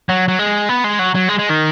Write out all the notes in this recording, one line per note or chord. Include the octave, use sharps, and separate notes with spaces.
F#3
F#3
G#3
B3
G#3
F#3
F#3
G#3
G#3
D#3